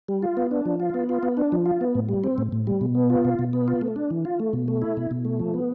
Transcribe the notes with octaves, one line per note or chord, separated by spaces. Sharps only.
G3
F4
B3
D4
F3
F4
B3
F4
B3
D4
F3
F4
B3
A2
G3
C4
A2
A2
G3
B2
B3
F4
B2
B2
B3
F4
A3
D4
E3
F4
A3
B2
A3
E4
B2
B2
A3
F3
B3